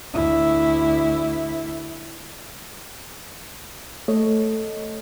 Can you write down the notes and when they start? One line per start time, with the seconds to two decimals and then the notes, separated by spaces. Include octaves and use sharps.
0.14 D2 E4
4.08 A3 A4 C#5 D#5